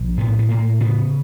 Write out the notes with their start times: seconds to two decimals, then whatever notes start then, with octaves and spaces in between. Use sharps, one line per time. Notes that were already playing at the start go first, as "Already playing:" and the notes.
Already playing: A#1
0.18 A2 B3
0.39 B3
0.49 A2 A#3
0.80 C#3 B3